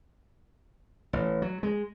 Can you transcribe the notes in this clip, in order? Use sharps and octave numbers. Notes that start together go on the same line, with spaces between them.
A1
F#3
G#3